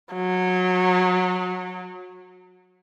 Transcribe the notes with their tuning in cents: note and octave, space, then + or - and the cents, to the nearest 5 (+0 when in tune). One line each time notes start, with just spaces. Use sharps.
F#3 -20